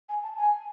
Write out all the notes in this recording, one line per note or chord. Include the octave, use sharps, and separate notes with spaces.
G#5
A5
G#5